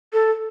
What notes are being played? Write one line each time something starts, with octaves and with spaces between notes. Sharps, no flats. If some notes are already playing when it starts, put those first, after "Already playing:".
A4